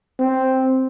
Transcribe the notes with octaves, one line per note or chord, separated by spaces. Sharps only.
C4